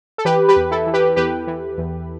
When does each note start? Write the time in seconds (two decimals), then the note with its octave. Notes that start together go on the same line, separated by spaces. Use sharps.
0.18 A4
0.25 E3 G4 B4
0.48 G4 B4
0.56 E2
0.71 E4 A4
0.87 E3
0.94 G4 B4
1.16 E2 G4 B4
1.47 E3
1.78 E2